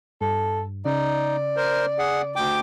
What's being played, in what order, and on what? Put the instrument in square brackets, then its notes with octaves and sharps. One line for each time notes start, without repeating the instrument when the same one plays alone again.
[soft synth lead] G2 [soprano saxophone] A4
[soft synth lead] C#3 [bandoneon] D#4 [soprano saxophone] D5
[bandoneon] A#4 C5
G#4 F#5
D2 G5 D6